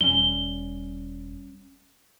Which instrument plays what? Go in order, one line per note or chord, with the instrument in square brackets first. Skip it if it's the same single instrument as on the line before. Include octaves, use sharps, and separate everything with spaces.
[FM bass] E1 [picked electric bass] G3 C#4 [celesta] G7